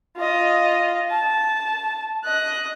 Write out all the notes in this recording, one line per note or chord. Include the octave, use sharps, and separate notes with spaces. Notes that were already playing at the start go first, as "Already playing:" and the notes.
F4 D#5
A5
D#5 F#6